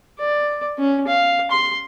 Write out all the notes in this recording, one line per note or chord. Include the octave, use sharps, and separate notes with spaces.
D5
C#4
F5
C6